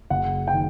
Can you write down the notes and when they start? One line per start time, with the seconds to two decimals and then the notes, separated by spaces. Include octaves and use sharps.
0.10 F#1 F#5
0.48 D#3 G5